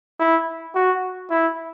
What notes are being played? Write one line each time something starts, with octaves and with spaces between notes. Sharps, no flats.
E4
F#4
E4